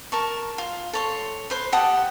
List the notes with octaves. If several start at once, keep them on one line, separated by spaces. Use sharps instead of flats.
A#4 A5 C#6
F4
A4 C#5 C6
B4 C5 C6
G4 F#5 A5 D#6